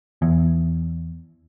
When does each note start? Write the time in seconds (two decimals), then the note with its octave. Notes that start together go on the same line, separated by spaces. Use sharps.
0.22 E2